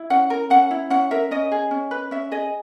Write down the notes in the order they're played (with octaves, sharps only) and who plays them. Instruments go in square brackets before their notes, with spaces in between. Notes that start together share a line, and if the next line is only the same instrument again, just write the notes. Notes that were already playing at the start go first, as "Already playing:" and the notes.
Already playing: [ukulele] E4
C#4 F#5
A#4
C#4 F#5
E4
C#4 F#5
A#4 E5
C#4 D#5
G#4
C#4
B4
C#4 E5
G#4 D#5